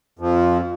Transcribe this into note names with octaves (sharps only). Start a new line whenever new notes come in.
F2 F3